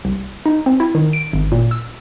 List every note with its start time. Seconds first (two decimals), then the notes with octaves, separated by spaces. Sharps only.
0.05 C2
0.46 D#4
0.66 C4
0.80 E4
0.95 D#3
1.13 D7
1.33 G#1
1.52 A#2
1.71 E6